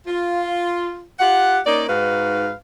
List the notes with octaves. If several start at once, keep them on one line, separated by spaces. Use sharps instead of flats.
F4
F4 G4 F#5
A#3 C#4 D#4 D5
G#2 D#4 F#4 B4 F5